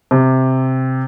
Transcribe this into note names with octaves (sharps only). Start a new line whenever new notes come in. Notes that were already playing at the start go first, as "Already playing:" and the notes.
C3